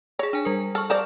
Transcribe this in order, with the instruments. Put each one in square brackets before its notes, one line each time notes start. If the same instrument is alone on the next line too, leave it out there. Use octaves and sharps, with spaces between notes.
[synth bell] G#4 A#6 [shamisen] C#5
[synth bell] D4 G#5
G3 A#4
[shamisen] A4 [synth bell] C#6 F6
[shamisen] F3 A#4 D5 [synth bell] G6 E7